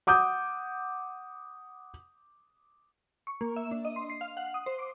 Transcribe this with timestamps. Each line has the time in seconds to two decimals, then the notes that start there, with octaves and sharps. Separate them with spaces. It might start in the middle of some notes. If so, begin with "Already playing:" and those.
0.07 F#5 D6 D#6 G6
3.27 C#6
3.41 A#3
3.56 E5
3.71 D4
3.85 D#5
3.96 C6
4.10 C7
4.21 F5
4.37 F#5
4.54 D#6
4.66 C5
4.79 D6